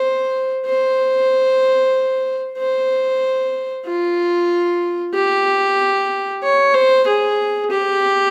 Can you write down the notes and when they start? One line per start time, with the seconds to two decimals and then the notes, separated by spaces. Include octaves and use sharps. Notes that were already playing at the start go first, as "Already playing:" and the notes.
Already playing: C5
0.66 C5
2.58 C5
3.86 F4
5.15 G4
6.43 C#5
6.74 C5
7.07 G#4
7.71 G4